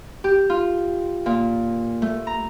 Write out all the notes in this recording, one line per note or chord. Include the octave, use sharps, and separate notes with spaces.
G4
F4
A#2
A3
A#5